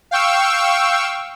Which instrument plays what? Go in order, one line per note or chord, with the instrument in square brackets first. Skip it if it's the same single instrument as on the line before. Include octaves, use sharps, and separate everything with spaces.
[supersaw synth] F5 G5 C#6 E6